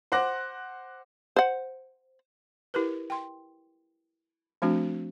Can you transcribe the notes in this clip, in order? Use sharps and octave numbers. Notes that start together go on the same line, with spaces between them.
C5 F#5 D6 F#6 A#6
C5 F#5
E4 G4 A#4 B4
G5 C6
F3 A3 C4 D4 F#4